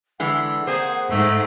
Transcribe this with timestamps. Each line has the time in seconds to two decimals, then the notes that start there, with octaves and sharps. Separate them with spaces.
0.20 D3 E3 G#3 F#5
0.67 A#3 C4 G#4 C5
1.11 G#2 A3